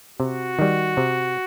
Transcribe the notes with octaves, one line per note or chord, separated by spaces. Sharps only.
C3 F#4
D#3 G3
C3